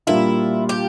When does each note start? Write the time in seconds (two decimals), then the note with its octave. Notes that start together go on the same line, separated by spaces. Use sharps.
0.07 A#2 G3 A#3 D4 E4 F4
0.69 G4